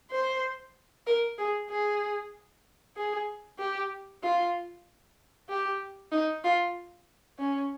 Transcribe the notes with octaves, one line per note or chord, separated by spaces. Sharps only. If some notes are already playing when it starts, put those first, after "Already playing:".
C5
A#4
G#4
G#4
G#4
G4
F4
G4
D#4
F4
C#4